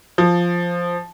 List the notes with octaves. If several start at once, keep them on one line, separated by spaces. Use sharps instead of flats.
F3